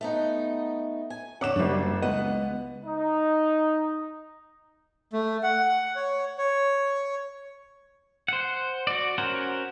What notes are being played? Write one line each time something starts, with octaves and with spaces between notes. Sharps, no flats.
A3 B3 D#4
G#5
D3 C#4 F#5 D6 E7
F#1 F#2 G3 D4
C#2 G#3 B3 D#5 F#5
D#4
A3
F#5
C#5
C#5
C5 F#5
F#4 D5
C#4 F#4 A#4 C5 F#5